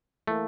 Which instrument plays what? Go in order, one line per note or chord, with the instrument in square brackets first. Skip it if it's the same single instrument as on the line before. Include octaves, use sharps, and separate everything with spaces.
[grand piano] E3 A#3 [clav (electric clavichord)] A3